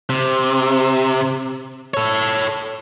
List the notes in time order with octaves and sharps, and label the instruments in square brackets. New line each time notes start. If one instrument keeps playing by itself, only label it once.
[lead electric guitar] C3
A4 C#5